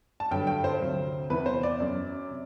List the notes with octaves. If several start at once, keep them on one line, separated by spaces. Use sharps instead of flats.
A5
G2 D3 F#3 G5
G5
C5
D2 C3 F#3
E2 C3 E3 B4
C5
D5
F#2 F#3
C3